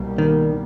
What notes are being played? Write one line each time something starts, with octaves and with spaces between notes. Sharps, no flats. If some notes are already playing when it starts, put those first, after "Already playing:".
Already playing: C2 B2 G3 A#3
D#3